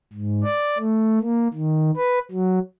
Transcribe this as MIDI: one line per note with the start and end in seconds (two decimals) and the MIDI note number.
0.13 0.44 44
0.44 0.78 74
0.79 1.19 57
1.21 1.48 58
1.54 1.91 51
1.97 2.19 71
2.32 2.59 54